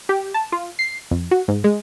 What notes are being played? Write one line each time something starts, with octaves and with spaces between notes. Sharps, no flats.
G4
A5
F4
C7
F2
F#4
G#2
G#3